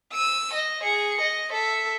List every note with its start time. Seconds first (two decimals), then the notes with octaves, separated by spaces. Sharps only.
0.13 E6 D#7
0.53 D#5
0.83 G#4 C#7
1.21 D#5
1.51 A4 E5